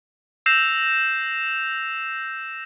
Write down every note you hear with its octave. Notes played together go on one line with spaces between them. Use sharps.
E6 G6 A#6 C7 E7 F7